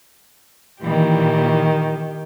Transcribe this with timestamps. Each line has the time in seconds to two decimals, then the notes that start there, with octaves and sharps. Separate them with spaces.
0.81 A#2 D#3 E3 G4